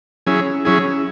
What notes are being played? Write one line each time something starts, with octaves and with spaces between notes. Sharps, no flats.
F#3 C#4 E4 G#4
F#3 C#4 E4 G#4